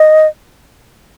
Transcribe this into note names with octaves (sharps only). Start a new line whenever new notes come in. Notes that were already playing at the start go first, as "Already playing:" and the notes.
Already playing: D#5